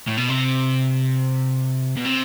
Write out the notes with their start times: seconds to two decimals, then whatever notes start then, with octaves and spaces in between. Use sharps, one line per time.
0.08 A2
0.17 B2
0.29 C3
1.97 B2
2.05 C3